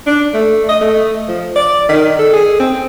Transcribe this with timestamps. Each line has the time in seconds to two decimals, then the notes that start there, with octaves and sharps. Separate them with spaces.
0.07 D4
0.34 A3
0.69 D#5
0.81 A3
1.28 F3
1.56 D5
1.89 D#3
2.19 A4
2.33 G#4
2.60 C4